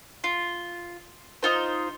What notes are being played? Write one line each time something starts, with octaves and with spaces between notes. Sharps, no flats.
F4
D#4 F4 C5